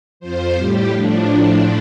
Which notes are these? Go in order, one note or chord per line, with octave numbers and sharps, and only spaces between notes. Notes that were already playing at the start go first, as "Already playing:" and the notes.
F2 F3 C5
A2 G3 G4
A2 F3 D4